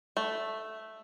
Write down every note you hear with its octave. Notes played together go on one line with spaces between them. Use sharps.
A3